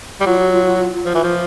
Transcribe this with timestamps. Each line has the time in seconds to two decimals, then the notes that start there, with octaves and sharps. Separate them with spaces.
0.21 G3
0.26 F#3 F4
0.39 F#4
0.52 F4
0.66 F4
0.79 F4
0.93 F4
1.05 F3
1.14 E3
1.24 F3